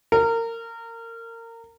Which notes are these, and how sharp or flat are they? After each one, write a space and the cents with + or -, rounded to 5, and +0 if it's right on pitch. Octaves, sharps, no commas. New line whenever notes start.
A#4 -25